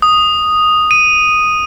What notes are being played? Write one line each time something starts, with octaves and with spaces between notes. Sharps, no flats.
D#6
D#7